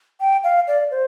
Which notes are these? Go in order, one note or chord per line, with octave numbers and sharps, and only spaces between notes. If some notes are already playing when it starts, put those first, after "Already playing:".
G5
F5
D5
C5